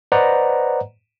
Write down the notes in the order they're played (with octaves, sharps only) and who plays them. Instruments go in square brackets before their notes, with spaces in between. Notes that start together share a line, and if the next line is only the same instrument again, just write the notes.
[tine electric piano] B4 C5 D5 D#5 F#5 A#5